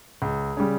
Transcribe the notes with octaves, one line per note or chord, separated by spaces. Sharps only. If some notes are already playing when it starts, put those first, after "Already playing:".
C#2
C#3 G3